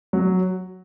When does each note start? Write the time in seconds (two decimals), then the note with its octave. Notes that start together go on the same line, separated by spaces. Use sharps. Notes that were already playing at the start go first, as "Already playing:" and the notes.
0.13 F#3